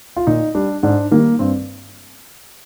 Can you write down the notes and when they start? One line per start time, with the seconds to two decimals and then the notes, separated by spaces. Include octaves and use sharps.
0.17 F4
0.27 A#2 D#4
0.55 G3 D4
0.83 G#2 D4
1.11 D#3 G3 A#3
1.39 G2 C4